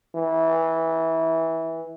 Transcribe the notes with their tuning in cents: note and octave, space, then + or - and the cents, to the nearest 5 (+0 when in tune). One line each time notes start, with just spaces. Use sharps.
E3 -15